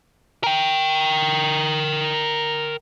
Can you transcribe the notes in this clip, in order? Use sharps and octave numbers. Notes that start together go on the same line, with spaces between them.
A#4 G5